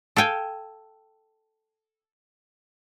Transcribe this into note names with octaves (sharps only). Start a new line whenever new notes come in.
A4 F5 G5 G#5